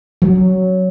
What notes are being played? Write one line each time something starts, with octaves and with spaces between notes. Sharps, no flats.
F#3